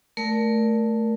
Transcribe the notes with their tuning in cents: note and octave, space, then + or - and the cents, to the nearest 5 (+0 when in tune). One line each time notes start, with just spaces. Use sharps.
A3 +0 A#4 +10 D5 +0